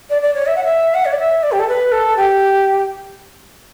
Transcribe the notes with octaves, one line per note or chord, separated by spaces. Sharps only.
D5
D5
C#5
E5
F#5
E5
F#5
C#5
D5
E5
D5
G4
A4
B4
A4
G4